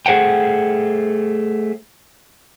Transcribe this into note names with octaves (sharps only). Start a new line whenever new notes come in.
A3 G#4 C5 F#5 G5